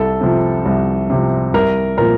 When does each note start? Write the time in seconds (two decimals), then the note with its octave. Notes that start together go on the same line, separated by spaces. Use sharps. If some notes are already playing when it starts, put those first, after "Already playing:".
Already playing: C2 A4
0.21 C3 F3
0.66 C2
1.10 C3 F3
1.54 C2 A#4
1.98 A#2 F3 A#4